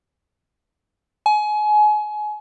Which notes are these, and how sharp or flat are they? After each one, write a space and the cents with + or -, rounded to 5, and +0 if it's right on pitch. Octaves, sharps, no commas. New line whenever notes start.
G#5 +30